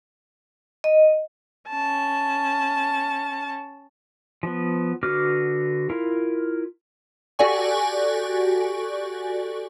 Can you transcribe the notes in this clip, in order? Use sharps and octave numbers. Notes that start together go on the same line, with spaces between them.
D#5
C#4 A5
F3 B3
D3 F#4 B4 D6 F6
E4 F4 A#4
F#4 G4 A4 D5 G#5 C#6